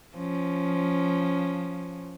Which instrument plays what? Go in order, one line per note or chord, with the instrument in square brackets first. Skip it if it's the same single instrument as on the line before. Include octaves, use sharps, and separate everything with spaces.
[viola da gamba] F3 C#4